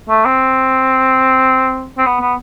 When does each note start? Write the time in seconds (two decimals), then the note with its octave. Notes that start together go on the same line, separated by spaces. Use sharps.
0.09 A3
0.25 C4
1.98 C4
2.06 B3
2.20 B3